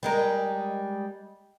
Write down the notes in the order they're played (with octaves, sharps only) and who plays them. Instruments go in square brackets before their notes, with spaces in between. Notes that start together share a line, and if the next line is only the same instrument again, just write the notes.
[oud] G3 G#3 A#4